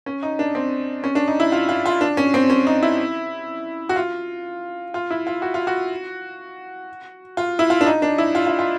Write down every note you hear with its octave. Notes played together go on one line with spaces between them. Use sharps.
C#4
D#4
D4
C4
C#4
D4
D#4
E4
F4
F4
F4
D4
C#4
C4
C#4
D#4
E4
F#4
F4
F4
E4
F4
F#4
F4
F#4
F4
E4
F4
D4
D#4
D4
E4
F4
F4
F4